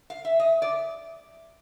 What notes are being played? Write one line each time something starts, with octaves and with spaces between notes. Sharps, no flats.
F5
E5
D#5
D5